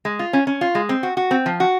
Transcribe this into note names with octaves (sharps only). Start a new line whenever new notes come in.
G#3
F4
C#4
C#4
F4
G#3
C4
F#4
F#4
C4
F3
F#4